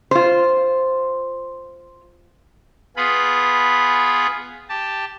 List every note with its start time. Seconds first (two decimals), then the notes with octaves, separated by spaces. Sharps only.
0.11 F4 C5
2.96 B3 F4 G#4 B5
4.69 G4 A5